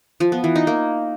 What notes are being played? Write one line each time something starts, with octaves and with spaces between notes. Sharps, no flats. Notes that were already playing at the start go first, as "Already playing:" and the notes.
F3
B3
E3
D#4
A#3